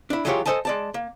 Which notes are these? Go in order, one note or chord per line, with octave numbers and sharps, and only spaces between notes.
D4 E4
E3 F#3 G#3 F4 G4 C#5
A4 A#4 C5 D#5 G#5 A5
G#3 D5 A5
A#3